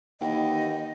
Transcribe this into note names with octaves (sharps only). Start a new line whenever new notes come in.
D#2 E3 D#5 F#5 G5